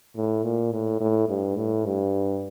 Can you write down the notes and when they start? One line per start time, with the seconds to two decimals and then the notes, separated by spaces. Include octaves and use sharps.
0.15 A2
0.43 A#2
0.72 A2
1.00 A2
1.29 G2
1.57 A2
1.86 G2